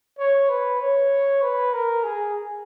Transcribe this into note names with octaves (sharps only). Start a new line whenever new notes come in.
C#5
B4
C#5
B4
A#4
G#4